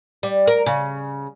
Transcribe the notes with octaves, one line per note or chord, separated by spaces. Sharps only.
G3
A#4
C#3